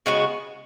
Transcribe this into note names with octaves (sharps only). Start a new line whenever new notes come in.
C#3 G#3 B3 F#4